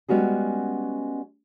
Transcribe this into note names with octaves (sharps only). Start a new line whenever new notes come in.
G3 G#3 B3 C#4 F#4 G#4